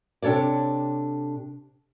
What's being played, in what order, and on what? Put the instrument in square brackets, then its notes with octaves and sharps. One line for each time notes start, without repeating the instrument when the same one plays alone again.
[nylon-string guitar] C3 D4 A4 C#5 D5